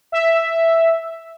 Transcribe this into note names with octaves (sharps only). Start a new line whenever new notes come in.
E5